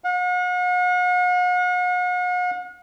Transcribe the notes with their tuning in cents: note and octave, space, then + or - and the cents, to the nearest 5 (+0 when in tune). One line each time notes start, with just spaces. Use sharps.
F#5 -45